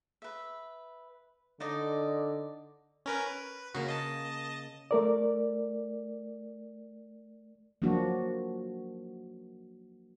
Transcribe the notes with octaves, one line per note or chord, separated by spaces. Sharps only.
B4 E5
D3 D#4 D5 D#5
C#4 A#4 B4
B4
C#3 A#3 F#4
D#5 A5
A3 A#4 D5
F3 F#3 A#3 D4 F#4